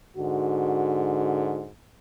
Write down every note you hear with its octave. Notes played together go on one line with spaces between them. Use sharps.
G#2 D3 F#4